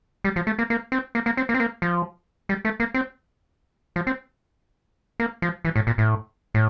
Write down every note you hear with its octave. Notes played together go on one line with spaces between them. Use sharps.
G3
F3
A3
A#3
A#3
C4
A#3
A#3
C4
A#3
C4
A#3
F3
G3
A3
A#3
C4
F3
C4
A#3
F3
E3
A2
A#2
A2
A2